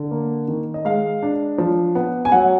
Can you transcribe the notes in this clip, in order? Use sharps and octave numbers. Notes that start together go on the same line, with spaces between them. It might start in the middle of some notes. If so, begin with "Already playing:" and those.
Already playing: D3
A#3
D#3
D#5
G#3 F5
D4
F3
B3
G#5
F#3 F#5